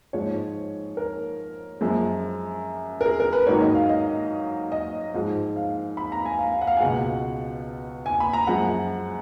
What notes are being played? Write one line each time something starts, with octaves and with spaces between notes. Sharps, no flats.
G#2 F3 G#3 C#5
A#4
F#2 F3 G#3
A#4
G#4
A#4
B4
G#2 D#3 F#3 C#5
D#5
F5
D#5
D#5
G#2 F3 G#3
F5
B5
A#5
G#5
F5
F5
F#5
F5
G#5
C#2 B2 G#3 F#5
G#5
B5
A#5
F#2 F3 G#3 F#5